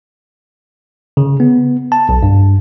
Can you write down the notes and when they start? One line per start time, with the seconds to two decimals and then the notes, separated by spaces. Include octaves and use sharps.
1.17 C#3
1.40 B3
1.92 A5
2.09 B1
2.23 G2